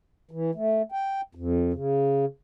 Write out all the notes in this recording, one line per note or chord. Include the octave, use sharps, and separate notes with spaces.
E3
A3
G5
F2
C#3